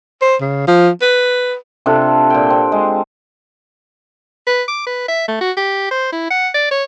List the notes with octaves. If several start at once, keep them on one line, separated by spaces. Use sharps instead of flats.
C5
C#3
F3
B4
C3 D4 F4 A4
A#2 G5
C4
G#3
B4
D6
B4
E5
A3
F#4
G4
C5
E4
F#5
D5
C#5